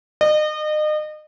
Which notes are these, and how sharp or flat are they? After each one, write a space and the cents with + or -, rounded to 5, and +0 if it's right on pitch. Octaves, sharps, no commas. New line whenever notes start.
D#5 -35